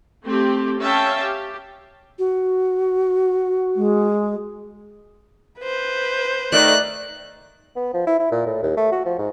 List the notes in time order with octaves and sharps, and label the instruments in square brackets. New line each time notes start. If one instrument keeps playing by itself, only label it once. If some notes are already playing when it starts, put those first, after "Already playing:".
[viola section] A3 C4 G4
C#4 C#5 E5 F5 G5 A5
G4
[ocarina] F#4
[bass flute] G#3
[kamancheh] B4 C5
[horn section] D#3 A3 [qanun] D5 [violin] F#6
[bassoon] B3
F3
E4
E4
A#2
A2
D#2
A3
F#4
F3
G#2